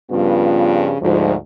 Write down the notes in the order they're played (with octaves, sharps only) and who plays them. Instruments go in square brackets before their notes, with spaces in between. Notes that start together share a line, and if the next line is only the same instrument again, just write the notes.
[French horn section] G2 C#3 F3 G3 B3 F4
D2 G#2 F3